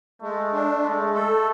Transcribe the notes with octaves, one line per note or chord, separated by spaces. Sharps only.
G#3 A3
D4
G#3 A3
A3 A4